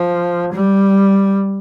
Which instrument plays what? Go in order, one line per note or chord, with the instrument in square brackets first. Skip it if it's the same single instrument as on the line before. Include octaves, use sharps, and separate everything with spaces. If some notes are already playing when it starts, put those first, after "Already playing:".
Already playing: [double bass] F3
G3